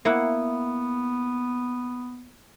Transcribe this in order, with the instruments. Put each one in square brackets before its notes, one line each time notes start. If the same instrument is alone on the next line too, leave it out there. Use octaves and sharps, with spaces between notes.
[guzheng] A#3 E4 F#5 [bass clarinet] B3